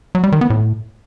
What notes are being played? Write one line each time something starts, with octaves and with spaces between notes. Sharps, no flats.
F#3
G3
D#3
B3
A2